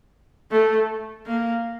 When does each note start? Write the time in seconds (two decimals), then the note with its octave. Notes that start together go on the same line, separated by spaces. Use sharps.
0.51 A3
1.27 A#3